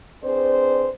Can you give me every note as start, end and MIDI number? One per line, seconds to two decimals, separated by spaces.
0.24 0.88 60
0.24 0.88 62
0.24 0.88 68
0.24 0.88 71
0.24 0.88 72
0.24 0.88 74